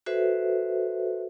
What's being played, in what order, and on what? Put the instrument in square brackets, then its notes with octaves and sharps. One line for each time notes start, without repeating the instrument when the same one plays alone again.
[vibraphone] F#4 A4 B4 C5 E5